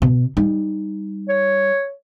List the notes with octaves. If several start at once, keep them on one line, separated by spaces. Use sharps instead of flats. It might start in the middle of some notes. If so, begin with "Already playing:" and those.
B2
G3 D#4
C#5